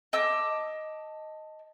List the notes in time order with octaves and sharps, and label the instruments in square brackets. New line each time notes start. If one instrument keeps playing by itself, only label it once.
[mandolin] D#5 A5 D6 E6